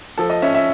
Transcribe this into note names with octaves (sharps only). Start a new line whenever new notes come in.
F3 A4
D#5
C#4 E5
E5